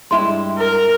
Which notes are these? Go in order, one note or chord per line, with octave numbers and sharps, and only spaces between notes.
G2 G#3 E4 C6
A#4